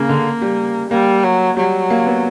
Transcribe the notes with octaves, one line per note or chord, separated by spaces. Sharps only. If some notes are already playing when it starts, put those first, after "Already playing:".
Already playing: C#3 A#3
D3
G3
G3 A#3
F#3
F#3 G3
A#3
B3